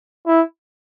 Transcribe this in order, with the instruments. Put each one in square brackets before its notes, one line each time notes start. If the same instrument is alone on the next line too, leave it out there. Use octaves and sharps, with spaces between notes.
[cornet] E4